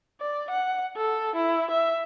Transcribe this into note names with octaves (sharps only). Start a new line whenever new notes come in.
D5
F#5
A4
E4
E5